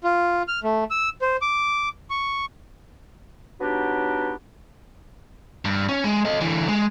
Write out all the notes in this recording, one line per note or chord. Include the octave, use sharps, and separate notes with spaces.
F4
F6
A3
E6
C5
D6
C#6
F#3 B3 D4 D#4 F#4 G4
G2
C#4
G#3
A4 D#5
D3 E3
G#3